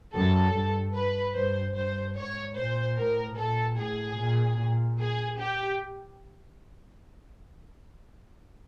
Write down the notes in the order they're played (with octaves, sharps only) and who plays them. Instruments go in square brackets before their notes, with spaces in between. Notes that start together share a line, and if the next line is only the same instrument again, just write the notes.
[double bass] F#2 [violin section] A4
[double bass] G2
[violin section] B4
[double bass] G2 [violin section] C5
[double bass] G2 [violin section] C5
[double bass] G#2 [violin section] C#5
[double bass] A#2 [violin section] C5
[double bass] A2 [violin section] A#4
[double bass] A#2 [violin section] A4
[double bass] A2 [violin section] G#4
[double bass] A#2
A#2
[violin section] G#4
G4